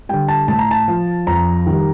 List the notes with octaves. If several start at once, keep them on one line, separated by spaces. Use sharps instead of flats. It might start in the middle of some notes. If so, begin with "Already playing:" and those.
D3 G3 G5
A5
A2 A5
A#5
A5
F3
F2 A#5
D#3 G3